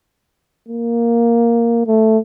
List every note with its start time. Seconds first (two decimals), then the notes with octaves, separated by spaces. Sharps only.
0.69 A#3
1.87 A3